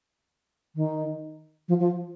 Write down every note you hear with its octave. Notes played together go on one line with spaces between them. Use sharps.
D#3
F3
F3